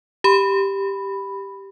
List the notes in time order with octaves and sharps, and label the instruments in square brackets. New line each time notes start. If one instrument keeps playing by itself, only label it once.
[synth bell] G4 B5